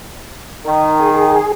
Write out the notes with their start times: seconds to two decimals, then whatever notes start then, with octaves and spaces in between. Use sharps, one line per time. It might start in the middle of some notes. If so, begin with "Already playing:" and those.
0.65 D#3
1.00 G#4